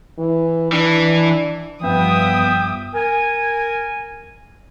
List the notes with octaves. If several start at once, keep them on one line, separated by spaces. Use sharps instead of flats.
E3
E3 D4
G2 F3 B3 E5 G5 D#6
A#4 G#5